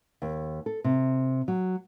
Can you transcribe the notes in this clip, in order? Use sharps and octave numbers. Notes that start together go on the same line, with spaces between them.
D#2
A4
C3
F#3